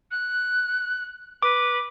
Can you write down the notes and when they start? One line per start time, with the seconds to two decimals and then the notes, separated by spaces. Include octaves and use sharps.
0.11 F#6
1.43 B4 D6